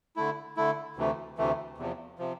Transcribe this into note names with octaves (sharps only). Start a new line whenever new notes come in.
D3 A3 E4
D3 A3 E4
D2 C3 E3 A3
D2 C3 E3 A3
E2 C3 F3
C3 F3